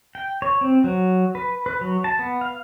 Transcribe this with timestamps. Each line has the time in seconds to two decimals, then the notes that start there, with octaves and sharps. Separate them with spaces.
0.15 G5
0.42 C#5
0.61 C4
0.84 F#3
1.35 B4
1.66 B4
1.81 F#3
2.04 A5
2.19 B3
2.41 F5